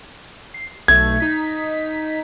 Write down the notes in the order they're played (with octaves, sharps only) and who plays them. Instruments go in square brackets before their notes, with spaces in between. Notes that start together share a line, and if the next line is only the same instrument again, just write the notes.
[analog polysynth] C7
[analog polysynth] B1 A3 [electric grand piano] G#6
[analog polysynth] D#4 B6